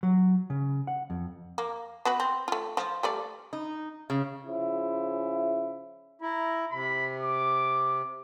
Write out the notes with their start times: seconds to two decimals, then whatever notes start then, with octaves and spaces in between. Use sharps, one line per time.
0.03 F#3
0.50 C#3
0.87 F#5
1.10 F2
1.58 A#3
2.05 B3 F#4 B4
2.20 C4
2.48 A3 F4
2.77 F3
3.03 G3 A3 D5
3.53 D#4
4.10 C#3
4.46 C#3 F3 E4
6.22 E4 A#5
6.72 C3 B5
7.22 D6